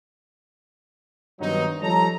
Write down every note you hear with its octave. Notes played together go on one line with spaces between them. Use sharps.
G2 D#3 F#3 B3 C4 D#4
F3 G3 A4 C#5 A#5